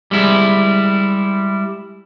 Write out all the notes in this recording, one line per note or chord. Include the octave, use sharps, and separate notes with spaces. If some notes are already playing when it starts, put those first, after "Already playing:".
G3 G#3 E4